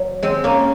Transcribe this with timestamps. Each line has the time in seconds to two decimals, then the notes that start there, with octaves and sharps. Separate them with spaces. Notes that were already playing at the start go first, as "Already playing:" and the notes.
Already playing: F#3
0.23 G#3 C4
0.44 A#3 C#4